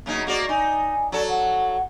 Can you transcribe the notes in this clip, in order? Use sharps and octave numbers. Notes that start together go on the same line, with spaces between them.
F#2 C#3 A#3 D#4
A#3 F#4 G#4 D5
D#4 G#5
F#3 A4 D5
F#5